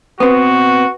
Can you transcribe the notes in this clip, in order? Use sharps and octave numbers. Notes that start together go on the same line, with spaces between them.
B3 C4 F#4 B4 D#6